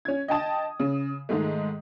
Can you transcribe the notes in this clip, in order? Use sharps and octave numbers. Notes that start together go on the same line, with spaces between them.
C#4 G#6
D#5 G5 A5 D#6
C#3
G#2 D#3 G#3 A3